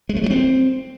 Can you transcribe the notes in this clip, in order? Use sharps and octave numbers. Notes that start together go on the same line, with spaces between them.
G#3
A3
F#3
C4